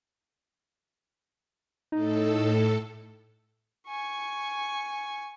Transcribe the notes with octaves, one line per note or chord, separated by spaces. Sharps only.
A2 D#4 A4
G#5 C#6